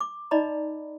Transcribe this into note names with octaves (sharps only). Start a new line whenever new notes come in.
D6
D#4 D5 D#5 A#5 B5